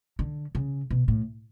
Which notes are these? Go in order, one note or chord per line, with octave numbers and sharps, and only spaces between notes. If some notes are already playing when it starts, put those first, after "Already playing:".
D3
C#3
B2
A2